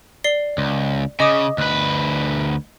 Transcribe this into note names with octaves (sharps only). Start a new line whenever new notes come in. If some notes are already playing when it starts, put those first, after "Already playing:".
D5 C7 G7
C#2
C#3 D#5 D6 D#6
D2 B4 F#6